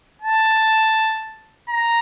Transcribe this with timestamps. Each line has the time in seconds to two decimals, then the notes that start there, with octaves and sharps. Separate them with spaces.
0.22 A5
1.70 A#5